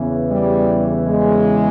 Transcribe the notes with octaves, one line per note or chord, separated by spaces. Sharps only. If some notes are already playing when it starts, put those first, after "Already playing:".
Already playing: E2 C#3 E3
G3
G#3